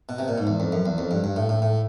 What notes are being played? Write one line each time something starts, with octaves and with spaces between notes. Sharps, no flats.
B2
C3
A#2
G#2
E2
F2
F#2
E2
F2
G2
G2
A2
A2
A2